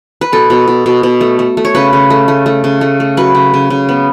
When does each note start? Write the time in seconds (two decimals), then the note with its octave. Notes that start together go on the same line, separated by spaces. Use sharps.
0.21 B4
0.32 B2 A4
0.50 B2
0.68 B2
0.86 B2
1.03 B2
1.21 A3
1.39 A3
1.57 A3
1.65 C#5
1.75 C#3 B4
1.93 C#3
2.10 A3
2.28 A3
2.46 A3
2.64 C#3
2.81 A3
3.00 A3
3.17 F#3 B4
3.35 C#3
3.54 C#3
3.70 C#3
3.89 B3